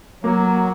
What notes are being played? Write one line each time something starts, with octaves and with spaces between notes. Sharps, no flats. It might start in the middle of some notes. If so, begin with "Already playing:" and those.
F#3 A#3